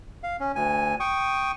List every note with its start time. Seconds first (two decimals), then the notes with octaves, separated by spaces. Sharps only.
0.23 F5
0.40 C#4
0.56 D2 G#5
1.00 G5 C#6 D#6